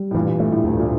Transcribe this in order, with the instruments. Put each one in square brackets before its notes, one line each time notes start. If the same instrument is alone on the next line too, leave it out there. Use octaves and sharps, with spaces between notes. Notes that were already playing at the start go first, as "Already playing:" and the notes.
Already playing: [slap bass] G3
[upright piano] A2
[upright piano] G2 A#2 [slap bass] E3
[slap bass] A3
[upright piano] G2
A2
[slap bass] D2
[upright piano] A#2